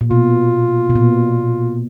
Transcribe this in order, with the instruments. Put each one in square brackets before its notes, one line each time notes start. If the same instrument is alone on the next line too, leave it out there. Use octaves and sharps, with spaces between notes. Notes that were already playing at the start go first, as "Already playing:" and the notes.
[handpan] A#2
[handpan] B2 [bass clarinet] F4
[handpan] B2
A#2